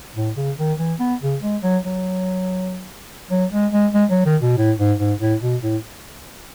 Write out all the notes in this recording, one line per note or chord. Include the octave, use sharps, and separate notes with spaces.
A2
C#3
D#3
E3
B3
C#3
G#3
F#3
F#3
F#3
G#3
G#3
G#3
F#3
D#3
B2
A2
G#2
G#2
A2
B2
A2